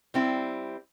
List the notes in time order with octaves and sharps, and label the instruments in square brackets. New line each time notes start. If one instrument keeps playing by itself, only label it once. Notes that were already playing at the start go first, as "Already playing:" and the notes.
[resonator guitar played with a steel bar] G3 C4 E4